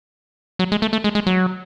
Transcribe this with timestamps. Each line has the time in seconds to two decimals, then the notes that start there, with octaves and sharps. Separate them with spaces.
0.59 F#3
0.72 G#3
0.82 A3
0.93 A3
1.04 G#3
1.15 G#3
1.27 F#3